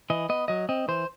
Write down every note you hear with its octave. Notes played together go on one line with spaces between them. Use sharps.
E3 D#5
B3 D#5
F#3 D#5
C4 D#5
E3 C5